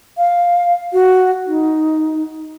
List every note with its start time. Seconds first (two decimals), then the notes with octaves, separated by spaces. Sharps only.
0.18 F5
0.93 F#4
1.47 D#4